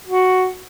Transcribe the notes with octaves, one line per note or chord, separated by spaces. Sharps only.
F#4